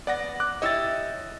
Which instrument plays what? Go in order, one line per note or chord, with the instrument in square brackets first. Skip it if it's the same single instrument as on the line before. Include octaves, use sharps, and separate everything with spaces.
[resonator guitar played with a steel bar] B3 [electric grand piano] D5 F#5 A#6
[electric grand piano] D6 F#6
[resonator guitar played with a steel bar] E4 G4 C#5 [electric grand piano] D#5 E6 A6